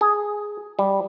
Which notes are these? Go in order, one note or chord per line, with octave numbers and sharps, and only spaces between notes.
G#4
G3